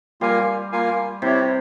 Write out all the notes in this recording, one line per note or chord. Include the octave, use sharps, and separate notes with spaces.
G3 A#3 F4 A#4 F5 G#5
A#3 F4 A#4 F5 G#5
C3 E4 G4 C#5